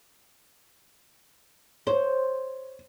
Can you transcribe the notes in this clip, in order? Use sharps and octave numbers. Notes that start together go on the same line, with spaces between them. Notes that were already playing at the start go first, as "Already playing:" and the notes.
C5 C#5